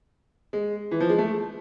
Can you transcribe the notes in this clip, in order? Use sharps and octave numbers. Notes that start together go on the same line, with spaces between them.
G#3
E3
F3
G#3
A3